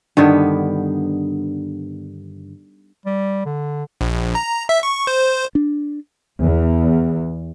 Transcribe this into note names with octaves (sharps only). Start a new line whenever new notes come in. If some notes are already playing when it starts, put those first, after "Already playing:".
G2 D3 D#3 B3
G3
D3
A#1
A#5
E5
C#6
C5
D4
E2